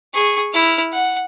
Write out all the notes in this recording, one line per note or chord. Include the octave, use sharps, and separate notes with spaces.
G#4 C#6
E4 F6
F#5